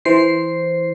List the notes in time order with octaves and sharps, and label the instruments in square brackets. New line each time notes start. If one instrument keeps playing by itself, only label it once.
[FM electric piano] E3 C5 C7